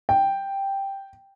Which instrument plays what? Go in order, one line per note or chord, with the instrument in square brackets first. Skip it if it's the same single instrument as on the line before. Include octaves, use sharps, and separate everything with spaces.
[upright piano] G5